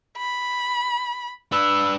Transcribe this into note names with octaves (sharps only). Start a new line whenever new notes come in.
B5
D4 B4 E6